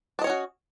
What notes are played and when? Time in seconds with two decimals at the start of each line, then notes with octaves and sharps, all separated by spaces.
0.19 D4
0.21 D#5
0.24 C#5
0.27 C#4
0.30 F#4